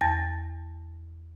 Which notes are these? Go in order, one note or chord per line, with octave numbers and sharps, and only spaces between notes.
E2 A5 A6 A#6